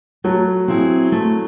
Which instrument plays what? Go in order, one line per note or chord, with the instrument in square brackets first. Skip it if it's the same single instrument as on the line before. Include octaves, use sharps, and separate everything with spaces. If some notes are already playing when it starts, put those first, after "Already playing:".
[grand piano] F#3 [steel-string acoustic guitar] A3
[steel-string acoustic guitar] C4 E4 G#4 C5
A3